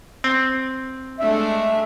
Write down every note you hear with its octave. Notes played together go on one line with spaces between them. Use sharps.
C4
G#3 A3 D4 E5